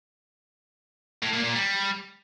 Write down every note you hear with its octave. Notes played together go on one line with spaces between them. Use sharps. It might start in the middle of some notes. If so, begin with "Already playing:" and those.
A2
A#2
A#2
G3